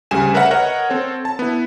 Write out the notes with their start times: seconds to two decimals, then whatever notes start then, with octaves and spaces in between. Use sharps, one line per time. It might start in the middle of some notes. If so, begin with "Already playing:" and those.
0.11 D2 C#3 G3 G#5 E7
0.34 A#4 B4 C#5 E5 F#5 A#5
0.51 A#4 C#5 D#5 F#5
0.90 C4 A4 C#5
1.25 A5
1.39 B3 E4